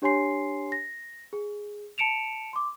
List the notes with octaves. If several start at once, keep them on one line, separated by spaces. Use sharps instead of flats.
D4 G4 C#5 G#5 C6 C7
A#6
G#4
A5 C#7 D7 E7 F7
C6 D6